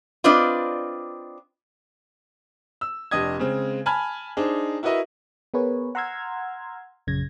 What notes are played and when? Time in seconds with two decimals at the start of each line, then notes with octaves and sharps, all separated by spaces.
0.24 C4 D4 F4 B4 D5 D#5
2.81 E6
3.11 F1 D4 G4 D#5 D#6 G#6
3.39 C#3 G#3 C4
3.86 G#5 A5 B5 F6 G#6
4.37 D4 D#4 G#4 C5
4.83 E4 F#4 A#4 B4 D#5 E5
5.54 B3 G#4 A#4 B4 C#5
5.95 F#5 A#5 C6 E6 F6 G#6
7.07 A#1 F#2 C#3 G#6 A#6